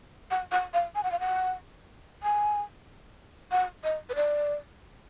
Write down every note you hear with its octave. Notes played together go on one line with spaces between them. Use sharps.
F#5
F#5
F5
G#5
F#5
F5
F#5
G#5
F#5
D#5
B4
D5